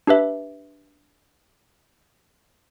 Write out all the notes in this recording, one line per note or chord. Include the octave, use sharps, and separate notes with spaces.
D4 G4 B4 E5